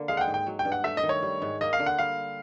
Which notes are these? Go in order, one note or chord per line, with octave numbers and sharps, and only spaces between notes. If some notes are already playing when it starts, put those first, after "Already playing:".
Already playing: D3 A#3
G#3 F5
F#5
G5
G#2
G5
F#3
G5
G2
F#5
A3 E5
D#5
D#3
C#5
G3
G#2
A#3 D#5
F5
D3
F#5
G3 F5